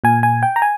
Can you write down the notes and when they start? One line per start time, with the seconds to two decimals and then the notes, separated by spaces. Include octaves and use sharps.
0.04 A#2 G#5
0.23 G#5
0.43 G5
0.56 A#5
0.62 G#5